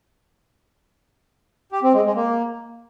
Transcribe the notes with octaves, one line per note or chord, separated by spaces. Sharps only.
G4
C4
G#3
G#3
A#3